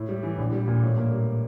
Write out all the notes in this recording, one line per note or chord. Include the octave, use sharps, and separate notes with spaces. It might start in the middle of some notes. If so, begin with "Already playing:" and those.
Already playing: A2
G3
E3
A#1
G3
A#2
A2
A#3
G3